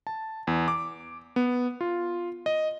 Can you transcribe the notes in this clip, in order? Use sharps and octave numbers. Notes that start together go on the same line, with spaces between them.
A5
E2
D6
B3
F4
D#5